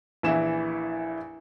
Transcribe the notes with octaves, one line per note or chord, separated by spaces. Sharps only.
A#1 E3 E4 E7